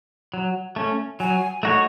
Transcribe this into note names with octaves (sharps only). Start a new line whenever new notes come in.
F#3
A3 C#4
F#3 G#5
A3 D#4 F#4 C#5